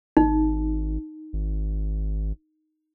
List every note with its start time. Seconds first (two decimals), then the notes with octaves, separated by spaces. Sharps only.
0.17 G#1 D#4
1.33 G#1